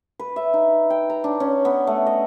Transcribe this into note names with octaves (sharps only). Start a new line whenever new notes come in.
B4
E5
D#4
G5
A#5
D4
C#4
B3
A3
D#5